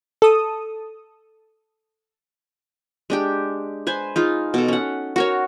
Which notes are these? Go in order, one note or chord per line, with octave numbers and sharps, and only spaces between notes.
A4 D#6
G#3 D4 G4
B4 C5 G#5
D#4 F4 G#4
B2 A4
C#4 F#5
F#4 A#4 C#5